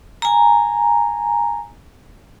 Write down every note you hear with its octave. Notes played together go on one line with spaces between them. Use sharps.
G#5 A#5